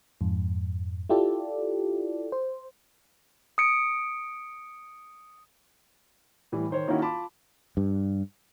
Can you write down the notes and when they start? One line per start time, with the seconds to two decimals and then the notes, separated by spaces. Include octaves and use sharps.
0.21 F2 G#2
1.09 E4 F4 G4 A4 D5
2.32 C5
3.58 D#6 C#7 D7
6.52 A2 E3 G3
6.71 D#3 C5 C#5
6.88 D#3 A#3 C#4 D#4 E4 F#4
7.02 F4 A5 B5 D6
7.77 G2